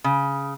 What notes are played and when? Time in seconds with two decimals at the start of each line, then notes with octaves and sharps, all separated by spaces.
0.04 C#3